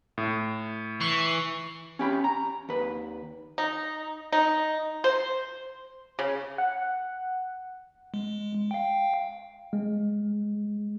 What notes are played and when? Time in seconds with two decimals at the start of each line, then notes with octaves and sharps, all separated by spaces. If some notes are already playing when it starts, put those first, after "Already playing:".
0.18 A2
1.01 E3 C#6 C7
1.99 C#4 G4 B5
2.24 A#5
2.69 D#2 B4
3.58 D#4
4.32 D#4
5.04 C5
6.19 C#3
6.58 F#5
8.14 G#3
8.71 F5 G5
9.73 G#3